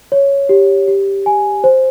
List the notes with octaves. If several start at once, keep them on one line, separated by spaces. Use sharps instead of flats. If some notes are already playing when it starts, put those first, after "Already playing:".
C#5
G4
G4
G#5
C5